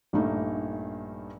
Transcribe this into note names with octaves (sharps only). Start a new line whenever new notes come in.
A#1 G2 A3 A#3 D#4